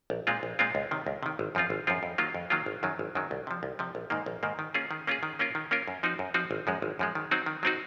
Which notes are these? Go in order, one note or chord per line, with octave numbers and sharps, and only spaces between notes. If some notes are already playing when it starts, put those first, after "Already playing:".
A#1
A#2 G#3 C4 F4
A#1
A#2 G#3 C4 F4
C#2
C3 D#3
C#2
C3 D#3
G#1
F#2 F3 C4 F4
G#1
F#2 F3 C4 F4
F2
D#3 F#3 A#3 F4
F2
D#3 F#3 A#3 F4
G#1
F#2 D#3 F#3
G#1
F#2 D#3 F#3
C2
C3 F3
C2
C3 F3
A#1
G#2 D#3 A#3
A#1
G#2 D#3 A#3
D#3
A#3 C#4 F4 G#4
D#3
A#3 C#4 F4 G#4
D#3
A#3 C#4 F4 A#4
D#3
A#3 C#4 F4 A#4
F#2
F3 C4 D#4 F#4
F#2
F3 C4 D#4 F#4
G#1
F#2 F3 G#3
G#1
F#2 F3 G#3
D#3
F#3 C4 D#4 F#4
D#3
F#3 C4 D#4 F#4